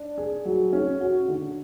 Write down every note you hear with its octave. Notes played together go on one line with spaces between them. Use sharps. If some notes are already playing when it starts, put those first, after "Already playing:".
Already playing: D4
G#4
F#3
C#4
F#4
D3